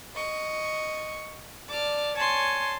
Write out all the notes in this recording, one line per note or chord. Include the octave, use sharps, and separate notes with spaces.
D#5 C#6
D5 A5 D6 F6
C#5 G#5 A5 C6